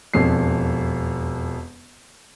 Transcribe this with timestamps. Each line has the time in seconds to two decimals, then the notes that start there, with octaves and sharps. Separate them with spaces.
0.14 E1 F2 C7